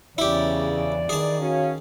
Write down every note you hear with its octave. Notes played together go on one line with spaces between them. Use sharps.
E2 G2 C#3 E3 E4 G4 D5
D#3 G#4 A5
C#4 F#4 C#5 F5